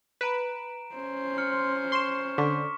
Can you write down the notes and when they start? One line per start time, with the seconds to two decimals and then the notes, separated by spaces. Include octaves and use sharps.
0.21 B4 A#5 D7 E7
0.95 C#4 C5
1.38 C6 F6 C#7
1.92 C6 C#6 E7
2.38 D3 C#6 D6 B6